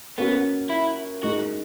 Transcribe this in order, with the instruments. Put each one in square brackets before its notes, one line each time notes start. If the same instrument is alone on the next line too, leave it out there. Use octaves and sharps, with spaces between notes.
[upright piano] A#3 C#4 F#4 A#4 [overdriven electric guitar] B3
[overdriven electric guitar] E4
[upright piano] G#3 D#4 A#4 [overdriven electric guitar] F#4